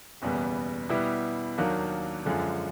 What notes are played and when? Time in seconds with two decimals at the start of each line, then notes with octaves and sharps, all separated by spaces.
0.22 F#1 E2 B2 G3 B3
0.89 B2 G3 B3 E4 G4
1.58 D#2 D#3 F#3 A#3 D4
2.26 F#2 D3 F3 G#3